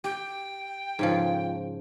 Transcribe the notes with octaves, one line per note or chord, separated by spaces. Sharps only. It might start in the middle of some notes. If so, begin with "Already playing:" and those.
G4 G5
G#2 C#3 F3